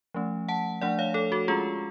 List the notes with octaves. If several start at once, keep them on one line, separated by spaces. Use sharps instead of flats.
F3 A3 C#4
F#5 A5
F3 A3 D4 D5 F#5
C#5 F5
A4 C#5
F#4 A4
G#3 C#4 F4 G#4